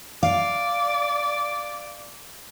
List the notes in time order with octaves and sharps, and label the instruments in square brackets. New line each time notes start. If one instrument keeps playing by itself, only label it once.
[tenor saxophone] D5 [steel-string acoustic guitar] F5